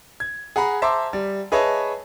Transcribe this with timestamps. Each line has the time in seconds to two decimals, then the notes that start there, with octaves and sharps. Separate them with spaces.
0.20 G#6
0.56 G#4 F#5 A#5 B5
0.82 C5 E5 A5 A#5 C6 D6
1.13 G3
1.52 G#4 B4 C#5 D#5 E5 A5